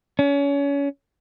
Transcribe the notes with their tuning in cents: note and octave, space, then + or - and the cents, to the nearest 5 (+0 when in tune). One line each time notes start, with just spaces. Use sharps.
C#4 +30